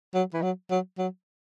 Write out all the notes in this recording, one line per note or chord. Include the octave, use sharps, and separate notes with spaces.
F#3
E3
F#3
F#3
F#3